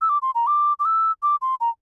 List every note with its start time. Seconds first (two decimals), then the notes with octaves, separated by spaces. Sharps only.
0.01 E6
0.09 D6
0.22 C6
0.35 A#5
0.47 D6
0.79 D6
0.85 E6
1.23 D6
1.42 C6
1.61 A#5